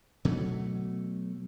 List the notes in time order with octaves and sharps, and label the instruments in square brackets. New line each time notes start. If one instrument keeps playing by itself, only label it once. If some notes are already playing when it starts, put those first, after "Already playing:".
[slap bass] B2 F#3 A3